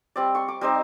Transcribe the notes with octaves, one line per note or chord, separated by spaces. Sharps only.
G3 C4 D5
C6 C#6
D6
G3 C4 D#4 C5